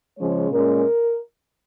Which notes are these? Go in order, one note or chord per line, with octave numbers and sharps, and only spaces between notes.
C#3 F3 G#3 C#4 C#5
A#2 G#3 C#4 A#4